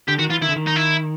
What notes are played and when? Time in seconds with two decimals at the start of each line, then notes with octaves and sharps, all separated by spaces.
0.08 D3 G4
0.19 D#3 F#4
0.30 E3 F4
0.41 D#3 E4
0.49 D3
0.56 D#3
0.67 D#4
0.76 E4